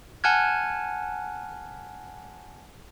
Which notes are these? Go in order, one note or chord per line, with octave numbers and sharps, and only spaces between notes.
F#5 G#5 A5 F6 F#6 G#6